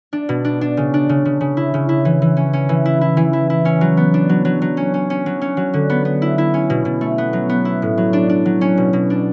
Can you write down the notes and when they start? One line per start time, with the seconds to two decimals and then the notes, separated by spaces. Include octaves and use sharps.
0.13 D4
0.29 B2
0.45 D4
0.61 D4
0.77 C#3
0.94 D4
1.09 C#3
1.25 C#3
1.41 C#3
1.57 E4
1.74 C#3
1.89 E4
2.05 E3
2.22 E3
2.37 C#4
2.53 C#4
2.69 E3
2.85 E4
3.01 E4
3.17 E3
3.33 E4
3.50 E4
3.65 C#4
3.81 F#3
3.97 B3
4.14 D4
4.29 F#3
4.45 F#3
4.62 F#3
4.77 C#4
4.94 C#4
5.10 C#4
5.26 F#3
5.41 C#4
5.57 F#3
5.74 D3
5.90 B3
6.05 B3
6.22 E4
6.38 E4
6.54 C#4
6.70 B2
6.85 B2
7.01 A3
7.18 B3
7.33 F#3
7.49 B3
7.65 E4
7.82 A2
7.98 F#3
8.13 D4
8.29 D4
8.46 F#3
8.61 C#4
8.78 B2
8.93 B2
9.10 D4